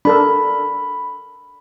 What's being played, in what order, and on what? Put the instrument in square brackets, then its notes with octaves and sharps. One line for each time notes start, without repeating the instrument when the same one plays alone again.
[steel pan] D4 A4 A#4 [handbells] B5